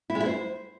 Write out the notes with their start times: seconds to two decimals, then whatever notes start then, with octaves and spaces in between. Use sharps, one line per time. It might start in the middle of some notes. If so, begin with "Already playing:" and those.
0.10 E4
0.15 G#3
0.20 E4
0.26 C5